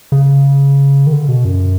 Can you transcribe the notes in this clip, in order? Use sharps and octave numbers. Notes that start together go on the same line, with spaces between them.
C#3
D#3
D3
B2
F#2